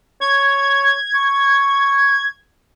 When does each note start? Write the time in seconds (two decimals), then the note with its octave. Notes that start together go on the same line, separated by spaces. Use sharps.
0.21 C#5 G#6
1.15 C#6